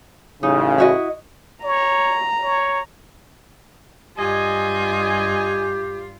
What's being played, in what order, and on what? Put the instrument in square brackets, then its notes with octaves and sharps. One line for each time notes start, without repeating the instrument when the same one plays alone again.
[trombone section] A1 C#3 [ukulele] D#4
[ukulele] E4 F#4 D#5
[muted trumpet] C#5 [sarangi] A#5
[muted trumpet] C#5
[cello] G2 F4 [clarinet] G4 [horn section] D#5 G#5